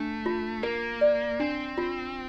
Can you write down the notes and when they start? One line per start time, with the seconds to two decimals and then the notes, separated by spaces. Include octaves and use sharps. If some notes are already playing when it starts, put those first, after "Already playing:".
Already playing: A3 D4
0.26 F4
0.63 A#3 A#4
1.01 D5
1.40 C4 D4
1.78 F4